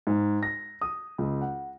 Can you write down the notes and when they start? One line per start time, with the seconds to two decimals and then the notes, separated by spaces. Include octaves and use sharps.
0.07 G#2
0.43 A#6
0.81 D#6
1.18 C#2
1.41 F#5